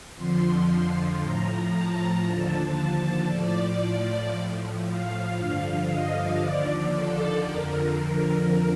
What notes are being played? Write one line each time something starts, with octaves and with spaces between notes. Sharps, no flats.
F2 D3 F3 C6
A2 F3 A#5
A5
D#2 D3 F3
A2 F3 D5
A2 F3
F5
G2 D3 F3
D#5
D#2 D3 F3 D5
A4
F2 D3 F3 A#4
A#4